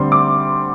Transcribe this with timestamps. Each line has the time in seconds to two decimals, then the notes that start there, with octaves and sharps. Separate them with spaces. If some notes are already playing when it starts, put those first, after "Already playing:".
Already playing: D2 D3 G3 C4 C6
0.12 D6